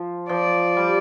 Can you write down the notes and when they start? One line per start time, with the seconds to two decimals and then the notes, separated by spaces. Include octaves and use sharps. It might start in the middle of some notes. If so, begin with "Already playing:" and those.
Already playing: F3
0.29 F3 D5
0.77 G3